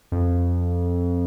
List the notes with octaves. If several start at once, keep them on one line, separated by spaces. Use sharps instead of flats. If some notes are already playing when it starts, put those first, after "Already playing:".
F2